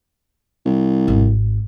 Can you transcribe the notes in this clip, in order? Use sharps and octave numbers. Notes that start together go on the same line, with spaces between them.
C2
G#1